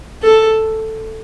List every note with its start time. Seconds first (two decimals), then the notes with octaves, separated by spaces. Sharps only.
0.22 A4